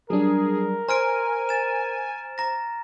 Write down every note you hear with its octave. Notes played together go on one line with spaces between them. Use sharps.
F#3 G3 D4 G#4 A#4
C5 G#5 A#5 F6 D7
A6 E7
A#5 A#6